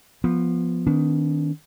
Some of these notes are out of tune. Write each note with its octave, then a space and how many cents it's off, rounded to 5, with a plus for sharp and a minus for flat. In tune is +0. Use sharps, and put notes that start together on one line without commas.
F3 +0 B3 -10
D#3 +0 B3 +20 D4 -40